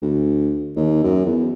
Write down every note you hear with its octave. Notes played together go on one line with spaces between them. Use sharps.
D2
D#2
F#2
E2